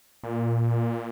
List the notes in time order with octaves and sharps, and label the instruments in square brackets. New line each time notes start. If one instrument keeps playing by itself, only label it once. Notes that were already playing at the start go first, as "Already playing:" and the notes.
[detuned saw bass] A#2